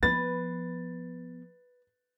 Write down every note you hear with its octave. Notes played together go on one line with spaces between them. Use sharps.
F3 B3 B4 A6